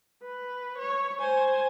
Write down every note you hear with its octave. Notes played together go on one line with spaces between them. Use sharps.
B4
C#5
C5 G#5